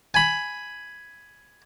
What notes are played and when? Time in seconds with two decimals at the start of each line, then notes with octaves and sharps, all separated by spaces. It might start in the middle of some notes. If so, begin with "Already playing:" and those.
0.14 G#5 B5